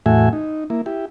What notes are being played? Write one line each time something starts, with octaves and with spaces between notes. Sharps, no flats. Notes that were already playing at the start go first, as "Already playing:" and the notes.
E2 A2 A3 F#4 E5 G#5
D#4
A#3 E4
E4 G4